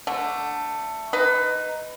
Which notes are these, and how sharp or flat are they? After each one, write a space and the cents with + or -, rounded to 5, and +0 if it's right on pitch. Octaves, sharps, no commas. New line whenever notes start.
D3 +0 A3 +15
D#4 +0 B4 +20